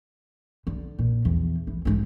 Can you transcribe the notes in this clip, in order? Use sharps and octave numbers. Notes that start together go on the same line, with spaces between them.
D3
A#2
E2
E3
G#2 G#3